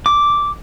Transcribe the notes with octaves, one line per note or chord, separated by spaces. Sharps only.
D6